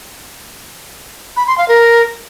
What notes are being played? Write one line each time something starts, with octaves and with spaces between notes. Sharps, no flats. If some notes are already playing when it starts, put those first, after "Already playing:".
B5
C6
F5
A#4